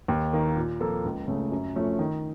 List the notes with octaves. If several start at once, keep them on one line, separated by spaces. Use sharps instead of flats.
D#2
D#3 A#3
A#2
F3 A#3 F4 A4
C#2
C#3 A3
F#2
F3 A3 C#4
D#3